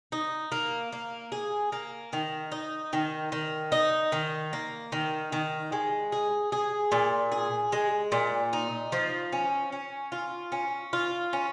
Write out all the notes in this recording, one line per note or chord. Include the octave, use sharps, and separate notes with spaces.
D#4
A#3
A#3
G#4
A#3
D#3
D#4
D#3
D#3
D#4
D#3
A#3
D#3
D#3
G#3
G#4
G#4
A#2
G#4
G#3
A#2
D#4
F3
C#4
C#4
F4
C#4
F4
C#4